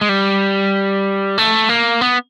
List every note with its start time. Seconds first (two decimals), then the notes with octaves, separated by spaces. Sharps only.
0.01 G#3
0.09 G3
1.38 A3
1.69 A#3
2.01 B3